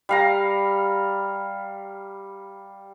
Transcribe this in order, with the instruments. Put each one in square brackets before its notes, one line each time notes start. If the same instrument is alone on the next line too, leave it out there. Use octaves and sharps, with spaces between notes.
[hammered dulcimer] G3 F5 A#5